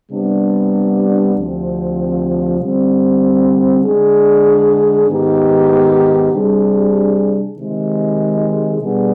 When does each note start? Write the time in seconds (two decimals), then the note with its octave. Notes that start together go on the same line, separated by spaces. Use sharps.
0.11 C3 G3 B3 D4
1.35 D2 C3 F3 C4
2.60 D3 G3 C4
3.84 D3 G#3 D4 G#4
5.08 G#2 D#3 B3 D#4 G4
6.33 C3 G3 D4 G#4
7.57 C3 D#3 G#3
8.82 B2 G3 B3 D4 G#4